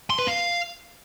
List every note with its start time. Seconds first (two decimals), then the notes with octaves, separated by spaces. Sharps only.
0.10 C6
0.19 B4
0.27 F5